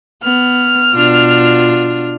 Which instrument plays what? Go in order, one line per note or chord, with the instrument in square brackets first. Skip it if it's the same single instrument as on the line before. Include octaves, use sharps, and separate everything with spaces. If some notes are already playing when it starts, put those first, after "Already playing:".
[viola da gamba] B3 [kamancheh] F6
[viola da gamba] B2 D4 F4